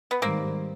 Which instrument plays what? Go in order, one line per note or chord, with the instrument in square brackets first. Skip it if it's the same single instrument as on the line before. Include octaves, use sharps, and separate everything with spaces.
[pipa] B3
[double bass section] G#2 D#3 G3 [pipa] A#3 C4